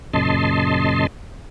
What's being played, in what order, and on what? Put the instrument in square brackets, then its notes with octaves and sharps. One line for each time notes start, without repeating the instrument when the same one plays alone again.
[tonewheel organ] F#2 A#2 C#3 D#5 A5 C6